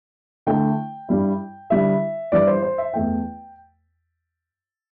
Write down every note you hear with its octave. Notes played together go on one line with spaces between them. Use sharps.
D3 A3 E4 G5
G2 G3 E4
D3 G3 E4 E5
G2 E3 G3 E4 D5
C5
C5
E5
E2 E3 A3 E4 G5